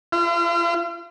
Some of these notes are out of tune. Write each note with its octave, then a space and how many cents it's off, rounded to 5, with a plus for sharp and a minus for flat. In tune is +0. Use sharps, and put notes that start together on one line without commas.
F4 -40